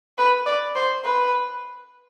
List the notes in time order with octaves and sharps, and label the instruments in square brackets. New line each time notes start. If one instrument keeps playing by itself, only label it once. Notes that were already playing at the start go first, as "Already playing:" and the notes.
[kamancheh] B4
D5
C5
B4